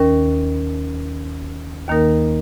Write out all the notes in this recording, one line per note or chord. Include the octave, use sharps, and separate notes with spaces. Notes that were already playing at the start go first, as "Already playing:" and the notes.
Already playing: D#2 D#3 C#4 A#4
D#2 D#3 A#3 D#4 A#4